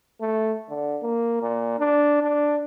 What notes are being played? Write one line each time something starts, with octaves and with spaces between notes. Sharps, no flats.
A3
D3
A#3
A#2
D4
D4